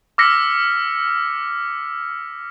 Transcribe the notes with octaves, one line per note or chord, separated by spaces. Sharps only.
D6 E6 F6 A#6 B6 C#7